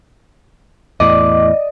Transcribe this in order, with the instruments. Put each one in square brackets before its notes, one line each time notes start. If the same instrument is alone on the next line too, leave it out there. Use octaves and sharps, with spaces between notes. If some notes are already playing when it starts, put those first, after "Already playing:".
[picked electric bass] E2 A2 [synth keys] D5 D#5 [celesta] D6